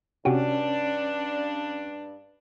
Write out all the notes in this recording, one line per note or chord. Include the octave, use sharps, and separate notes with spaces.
G2 C3 C#4 D4 F#4 G4